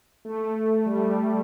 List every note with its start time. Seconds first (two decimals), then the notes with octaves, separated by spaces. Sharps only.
0.25 A3
0.86 G3